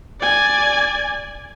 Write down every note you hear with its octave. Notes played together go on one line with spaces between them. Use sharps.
D5 G#5